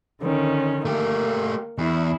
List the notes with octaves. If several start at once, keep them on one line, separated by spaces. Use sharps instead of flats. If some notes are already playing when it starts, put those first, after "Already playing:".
D3 D#3 C#4
A3 A#3 G4
E2 E4